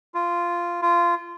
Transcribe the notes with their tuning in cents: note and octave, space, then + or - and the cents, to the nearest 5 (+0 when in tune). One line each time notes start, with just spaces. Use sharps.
F4 -10
F4 -20